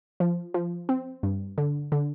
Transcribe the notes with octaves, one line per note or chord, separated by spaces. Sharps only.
F3
F3
C4
G2
D3
D3